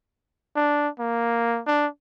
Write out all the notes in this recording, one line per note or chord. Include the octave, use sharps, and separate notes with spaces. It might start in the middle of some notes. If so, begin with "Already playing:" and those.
D4
A#3
D4